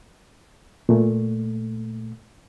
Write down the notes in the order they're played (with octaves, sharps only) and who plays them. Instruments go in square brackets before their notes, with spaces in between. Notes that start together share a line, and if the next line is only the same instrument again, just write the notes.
[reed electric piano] A#2 A3